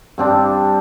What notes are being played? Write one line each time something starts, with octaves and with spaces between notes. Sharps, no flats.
G2 C4 D4